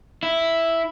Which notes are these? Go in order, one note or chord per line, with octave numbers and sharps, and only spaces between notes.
E4